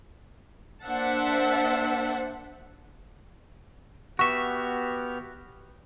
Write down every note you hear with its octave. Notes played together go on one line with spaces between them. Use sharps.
A#3 D4 C5 E5 F#5 A5
B3 F#4 G4 E5 C#6 F6